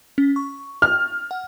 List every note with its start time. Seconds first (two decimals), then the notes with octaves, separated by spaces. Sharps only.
0.18 C#4
0.36 C#6
0.82 F6
1.31 F#5